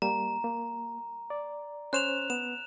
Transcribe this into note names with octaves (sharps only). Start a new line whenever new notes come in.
G3 A#3 A#5
A#3
D5
C#4 C5 C#5 F#6 E7 F7
B3 E7